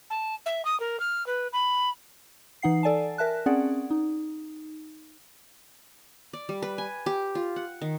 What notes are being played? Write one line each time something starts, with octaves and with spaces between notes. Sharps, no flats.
A5
E5
D#6
A#4
F6
B4
B5
E3 D#4 F#5 C7
A4 D5 G#5 A5
A#4 E5 A5 F#6
C4 C#4 G#4 D5 F#5
D#4
D5
G3
B4
G#5
G4
F4
F#5
D#3